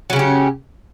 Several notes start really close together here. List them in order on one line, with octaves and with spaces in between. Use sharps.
F#3 C#3 C#4 G4